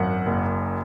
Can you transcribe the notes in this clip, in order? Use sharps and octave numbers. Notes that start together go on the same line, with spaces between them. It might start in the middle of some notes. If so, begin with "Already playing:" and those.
Already playing: G#1 F#2 F#5
F#1